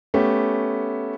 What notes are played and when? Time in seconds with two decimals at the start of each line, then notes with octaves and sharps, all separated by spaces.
0.14 A3 B3 C#4 G4